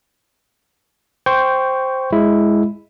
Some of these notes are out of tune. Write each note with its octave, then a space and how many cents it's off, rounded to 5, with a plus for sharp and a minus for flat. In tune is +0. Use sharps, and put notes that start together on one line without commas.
C5 +0 G5 -5 C#6 +10
G#3 +0 E4 +0